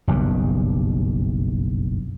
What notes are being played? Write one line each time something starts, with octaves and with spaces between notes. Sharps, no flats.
F#1 B1 G2